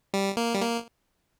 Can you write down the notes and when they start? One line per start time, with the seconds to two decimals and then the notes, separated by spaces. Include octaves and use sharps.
0.14 G3
0.37 A#3
0.53 G3
0.61 A#3